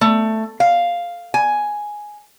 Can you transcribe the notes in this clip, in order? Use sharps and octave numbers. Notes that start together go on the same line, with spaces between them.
A3
F5
G#5